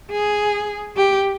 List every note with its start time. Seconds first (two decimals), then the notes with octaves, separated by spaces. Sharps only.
0.12 G#4
0.96 G4